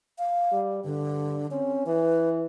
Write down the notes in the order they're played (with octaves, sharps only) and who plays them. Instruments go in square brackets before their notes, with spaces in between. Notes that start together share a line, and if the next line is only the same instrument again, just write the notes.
[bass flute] F5
[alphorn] G3
[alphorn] G2 [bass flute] D3
[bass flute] C4 [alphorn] C#4
[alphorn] E3 [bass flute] B4